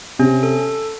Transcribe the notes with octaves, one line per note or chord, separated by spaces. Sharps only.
C3 C#4
A4